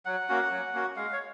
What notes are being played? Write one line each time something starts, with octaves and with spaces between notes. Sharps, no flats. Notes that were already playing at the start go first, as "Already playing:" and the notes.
F#3 F#5
A#3 C#4 F#4
F#3
A#3 C#4 F#4
G#3 F5
C#5